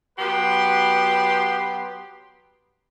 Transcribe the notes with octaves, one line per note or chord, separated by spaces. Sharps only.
F#3 B3 G4 B4 C6